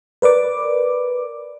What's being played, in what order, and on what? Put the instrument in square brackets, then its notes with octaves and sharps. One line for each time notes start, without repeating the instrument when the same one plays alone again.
[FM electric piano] A#4 B4 D5 D6